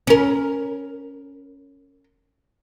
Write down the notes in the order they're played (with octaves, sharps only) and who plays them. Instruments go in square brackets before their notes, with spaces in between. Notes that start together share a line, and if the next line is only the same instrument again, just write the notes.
[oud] C#4 A#4